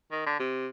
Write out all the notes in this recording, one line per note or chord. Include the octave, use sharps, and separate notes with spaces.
D#3
D3
C3